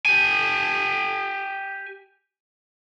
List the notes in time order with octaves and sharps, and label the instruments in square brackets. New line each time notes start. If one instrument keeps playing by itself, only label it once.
[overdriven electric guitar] G4 G#5